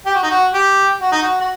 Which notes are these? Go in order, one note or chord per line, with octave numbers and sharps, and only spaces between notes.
G4
F#4
D#4
F#4
G4
F#4
D#4
F#4
F#4